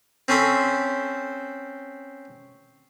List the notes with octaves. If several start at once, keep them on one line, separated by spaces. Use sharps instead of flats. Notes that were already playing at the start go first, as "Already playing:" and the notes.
C4 C#4 A4 C5 B5